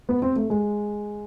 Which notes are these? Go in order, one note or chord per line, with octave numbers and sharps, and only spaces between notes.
B3
C4
A3
G#3